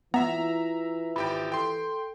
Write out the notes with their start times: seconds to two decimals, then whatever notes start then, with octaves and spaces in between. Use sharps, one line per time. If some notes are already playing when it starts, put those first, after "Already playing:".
0.14 E3 B3 E4 F4 E5 A#5
1.16 G#1 G4 G5 B5
1.52 A4 G5 C6